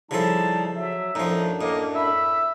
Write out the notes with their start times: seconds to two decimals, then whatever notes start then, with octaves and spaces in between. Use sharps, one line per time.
0.11 C#3 F3 G3 D#4 E4 A4 A5
0.75 F#3 E5
1.15 F#2 A2 F3 A3 D4 D#4
1.61 A2 A#3 D#5
1.95 E5 B5